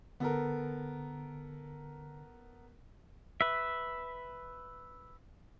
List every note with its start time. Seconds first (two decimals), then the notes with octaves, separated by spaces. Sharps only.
0.20 D3 B3 A4 A#4
3.41 B4 E5